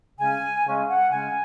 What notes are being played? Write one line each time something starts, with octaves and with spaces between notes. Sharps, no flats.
C#3 G#3 C#4 G#5
C#3 G#3 C#4
F#5
C#3 G#3 C#4 G#5